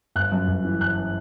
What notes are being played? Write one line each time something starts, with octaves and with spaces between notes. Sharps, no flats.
G1 F#6
F#2
G1
E3
G1 F#6